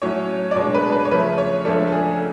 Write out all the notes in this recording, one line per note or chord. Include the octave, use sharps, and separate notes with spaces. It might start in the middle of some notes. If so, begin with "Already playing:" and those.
A2 F#3 C#4 C#5
D5
B2 G#3 D4 C#5
B4
B4
C#5
C#3 F3 A3 B4
C#5
C#2 C#3 F3 A3 D4 A4
A4
G#4